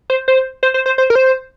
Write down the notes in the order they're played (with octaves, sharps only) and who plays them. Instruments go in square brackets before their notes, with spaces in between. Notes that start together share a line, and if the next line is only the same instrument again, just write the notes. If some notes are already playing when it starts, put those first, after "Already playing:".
[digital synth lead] C5
C5
C5
C5
C5
C5
A#4
C5